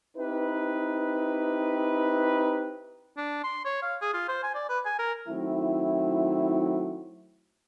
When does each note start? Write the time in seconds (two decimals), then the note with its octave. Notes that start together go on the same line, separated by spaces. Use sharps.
0.17 C4 D#4 E4 G4 B4
3.17 D4
3.44 C6
3.65 C#5
3.83 F5
4.02 G#4
4.14 F4
4.29 C5
4.43 G#5
4.55 D5
4.69 B4
4.85 G#5
4.99 A#4
5.28 D#3 F#3 A3 C4 E4